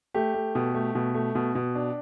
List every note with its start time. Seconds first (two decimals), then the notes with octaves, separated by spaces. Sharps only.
0.14 A3 G4
0.34 A3
0.55 B2
0.75 A3
0.95 B2
1.14 A3
1.35 B2
1.55 B2
1.75 D4